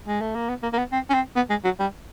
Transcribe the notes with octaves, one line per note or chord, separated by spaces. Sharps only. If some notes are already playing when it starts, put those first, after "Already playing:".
G#3
A3
A#3
B3
A#3
A#3
B3
C4
C#4
C4
B3
G#3
F#3
G3